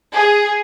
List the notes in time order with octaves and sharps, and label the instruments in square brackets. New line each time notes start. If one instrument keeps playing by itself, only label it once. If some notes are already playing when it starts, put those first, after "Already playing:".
[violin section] G#4